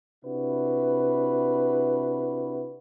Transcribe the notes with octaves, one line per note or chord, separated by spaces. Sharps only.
C3 D4 E4 F#4 B4